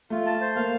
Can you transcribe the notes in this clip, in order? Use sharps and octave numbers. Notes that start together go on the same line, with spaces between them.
A3 F4
A5
C5
A#3 F5